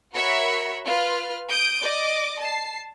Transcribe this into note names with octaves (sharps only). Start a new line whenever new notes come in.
F#4 A#4 C#5 E5 B5 C#7
F4 B4 F6
D#6 G6 D7
D5 D#5 D6
A5 C7